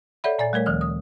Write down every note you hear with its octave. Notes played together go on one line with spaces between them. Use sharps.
A4 C#5 D5 E5 F#5 B5
A#2 D5 G#5 A6
G3 A3 A#4 C#5
D2 D#3 F3 F6
D#6